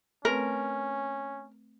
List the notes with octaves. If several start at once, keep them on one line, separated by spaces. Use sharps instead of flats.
A3 C4 C#4 A#4 B4